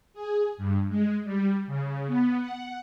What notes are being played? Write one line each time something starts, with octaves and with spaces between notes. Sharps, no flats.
G#4
G2
G#3
G3
C#3
B3
F#5